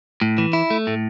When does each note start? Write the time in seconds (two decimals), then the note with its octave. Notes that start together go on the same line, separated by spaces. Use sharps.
0.21 A2
0.38 E3
0.53 E4
0.70 A3
0.87 A2